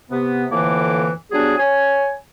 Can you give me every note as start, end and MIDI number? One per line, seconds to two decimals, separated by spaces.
0.10 0.44 48
0.10 0.44 59
0.50 1.10 41
0.50 1.10 45
0.50 1.10 50
0.50 1.10 52
0.50 1.10 58
0.50 1.10 86
1.32 1.54 54
1.32 1.54 55
1.32 1.54 59
1.32 1.54 62
1.32 1.54 68
1.58 2.12 73
1.58 2.12 80